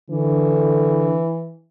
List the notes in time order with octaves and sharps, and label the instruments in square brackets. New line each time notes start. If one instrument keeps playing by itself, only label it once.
[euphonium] D3 [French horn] E3